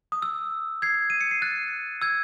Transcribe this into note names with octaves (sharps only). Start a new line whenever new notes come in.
D#6
E6
G#6 C7
D#7
C#7
C7
F#6 A6
E6 G#6